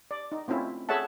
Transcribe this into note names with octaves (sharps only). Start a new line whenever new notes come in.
D5
D#4
A3 C4 C#4 E4 F4
G#4 A4 C#5 E5 F#5 A5